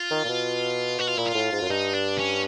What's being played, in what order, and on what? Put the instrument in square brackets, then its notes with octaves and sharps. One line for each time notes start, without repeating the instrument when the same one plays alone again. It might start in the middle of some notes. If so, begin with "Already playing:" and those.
Already playing: [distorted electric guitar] F4
[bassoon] D#3
A#2
B2
[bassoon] B2 [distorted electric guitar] F#4
[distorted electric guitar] F4
[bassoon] A#2 [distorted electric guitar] E4
[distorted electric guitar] F4
[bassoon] A2
G#2
F#2
[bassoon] G2 [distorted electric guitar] D#4
[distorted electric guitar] D4
C#4